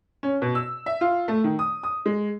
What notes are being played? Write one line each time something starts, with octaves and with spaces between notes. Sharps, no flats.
C#4
B2
E6
E5
F4
A3
D#3
D#6
D#6
G#3